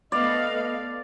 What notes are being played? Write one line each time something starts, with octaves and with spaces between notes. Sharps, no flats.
A3 B3 D5 D#5 F5